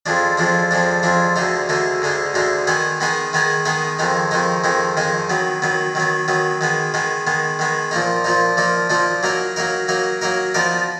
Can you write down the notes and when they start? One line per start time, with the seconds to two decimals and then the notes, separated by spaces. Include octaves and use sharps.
0.06 F2 F3 G#3 D4
0.37 F2 F3 G#3 D4
0.71 F2 F3 G#3 D4
1.03 F2 F3 G#3 D4
1.36 D2 D3 G#3 D#4
1.69 D2 D3 G#3 D#4
2.02 D2 D3 G#3 D#4
2.34 D2 D3 G#3 D#4
2.67 D#3 G#3 B3 D#4 G#4
3.01 D#3 G#3 B3 D#4 G#4
3.33 D#3 G#3 B3 D#4 G#4
3.65 D#3 G#3 B3 D#4 G#4
3.99 F2 D#3 G#3 D#4
4.31 F2 D#3 G#3 D#4
4.64 F2 D#3 G#3 D#4
4.97 F2 D#3 G#3 D#4
5.30 D#3 F#3 B3
5.62 D#3 F#3 B3
5.95 D#3 F#3 B3
6.28 D#3 F#3 B3
6.61 D#3 G#3 B3
6.94 D#3 G#3 B3
7.27 D#3 G#3 B3
7.59 D#3 G#3 B3
7.91 A#2 F3 A#3 D#4
8.24 A#2 F3 A#3 D#4
8.57 A#2 F3 A#3 D#4
8.90 A#2 F3 A#3 D#4
9.23 F#3 A#3 D#4 A#4
9.56 F#3 A#3 D#4 A#4
9.88 F#3 A#3 D#4 A#4
10.21 F#3 A#3 D#4 A#4
10.54 F3 B3 D#4 A#4 D5